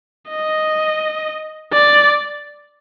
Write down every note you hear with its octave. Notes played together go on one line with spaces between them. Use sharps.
D#5
D5